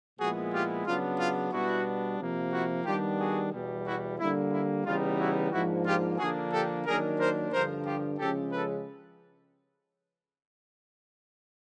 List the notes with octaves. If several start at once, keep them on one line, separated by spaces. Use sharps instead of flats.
A#2 F3 G#3 B3 E4 F#4 G#4
F4 G4
C#3 F#3 B3 D4 F4
F4
B2 G3 B3 D4 E4 F#4
C3 F3 A#3
E4 F#4
D#3 G3 B3 D4 F4 G4
F#4 G#4
E2 B2 G3
E4 F#4
D3 G3 A#3 E4
E4
C#3 E3 G3 B3 D#4 F4
E4 F#4
G#2 F3 A#3 D4 E4 F#4
F4 G4
D3 F3 A#3 D4 F#4 G#4
G4 A4
D#3 F#3 A#3 D4 G#4 A#4
A#4 C5
G2 D3 F3 A#4 C5
F4 G4
C#3 F3 G#3 C#4 G4 A4
A4 B4